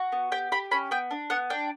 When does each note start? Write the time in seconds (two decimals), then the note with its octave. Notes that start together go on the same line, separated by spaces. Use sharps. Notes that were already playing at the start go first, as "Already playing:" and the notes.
Already playing: F#4
0.12 B3
0.32 G4 G5
0.52 G4 B5
0.71 C#4 B5
0.91 B3 G5
1.11 D4
1.30 B3 F#5
1.50 D4 G5